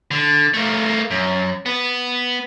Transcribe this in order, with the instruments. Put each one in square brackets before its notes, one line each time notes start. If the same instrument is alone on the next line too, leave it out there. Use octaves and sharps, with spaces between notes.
[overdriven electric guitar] D3
A3 A#3
F#2
B3